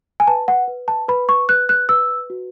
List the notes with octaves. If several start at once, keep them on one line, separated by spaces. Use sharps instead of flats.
G#5
B4 A5
F#5
B4
A5
B4 B5
C#6
B4 F#6
F#6
B4 E6
F#4